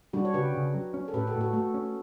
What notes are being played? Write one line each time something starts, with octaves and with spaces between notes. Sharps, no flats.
G3 D4 F#4
C#5
C#3 G4 B4
C#3
F#3
C#4
A4
A2 G4 B4
F#4 A4
A2
F#4 A4
A3 F#4 A4
C#4